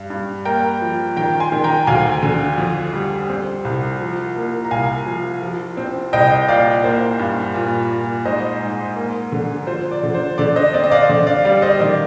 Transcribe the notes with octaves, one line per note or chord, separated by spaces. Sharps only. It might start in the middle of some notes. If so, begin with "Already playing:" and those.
Already playing: G2
G2
A#3 G5 A#5
F3
D#3 G5 A#5
G#5 C6
D#3
G5 A#5
D2 F5 G#5
D3
F2
G3
C4
C2
F3
A#3
A#5
C2 F5 G#5
F3
F3
C4
C2 D#5 G5
A#2 D5 F5
A#3 C5
G2
A#2
A#2
G#2 C5 D#5
G#2
A#3
D3
F3 C5
D5
D3
C5
D3 D5
C5 D#5
C4 D5
D#5
D5 F5
D3
D5 F5
G3 D5 F5
C5 D#5
D#3 D5